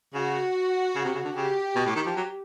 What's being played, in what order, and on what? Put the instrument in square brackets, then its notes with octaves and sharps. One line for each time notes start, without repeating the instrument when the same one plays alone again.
[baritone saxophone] C#3 [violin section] F#4
[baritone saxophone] C#3
C3
C#3
D3
[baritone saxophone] C#3 [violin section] G4
[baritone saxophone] B2
A2
D#3
F3
F#3